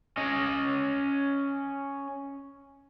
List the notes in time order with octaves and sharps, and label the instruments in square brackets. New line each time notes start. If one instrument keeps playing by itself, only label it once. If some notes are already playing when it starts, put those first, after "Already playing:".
[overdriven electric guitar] C#4 D#5